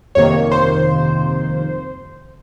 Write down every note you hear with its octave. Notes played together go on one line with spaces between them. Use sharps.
G1 F2 C3 D#3 A#3 C#5
C5